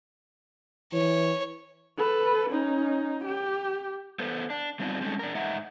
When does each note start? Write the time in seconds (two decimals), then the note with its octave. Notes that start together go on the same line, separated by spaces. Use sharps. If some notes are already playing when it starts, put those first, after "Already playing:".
0.93 E3 C#5
1.98 A4 B4
2.51 C#4 D#4
3.25 G4
4.19 B3 A4 B4 C5
4.50 D4
4.79 G3 B3 C4 D4 D#4 F4
5.01 G3 G#3 C4 C#4 D#4 A4
5.19 D4 A#4
5.35 G#2 D#4 E5 F#5 A#5